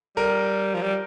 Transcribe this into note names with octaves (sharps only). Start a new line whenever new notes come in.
G3 A#4
F3
G3